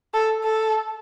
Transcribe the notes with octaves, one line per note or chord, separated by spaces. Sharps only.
A4
A4